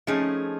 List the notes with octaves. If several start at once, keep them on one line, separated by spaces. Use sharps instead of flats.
F3 A3 C4 C#4 D#4 G#4